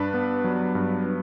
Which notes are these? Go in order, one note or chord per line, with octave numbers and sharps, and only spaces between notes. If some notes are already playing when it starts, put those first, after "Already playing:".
Already playing: G2 D4 B4
B3
F#3
G2
D4